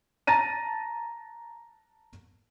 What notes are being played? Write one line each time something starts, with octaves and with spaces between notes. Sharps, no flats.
A5 A#5 A6 A#6 D#7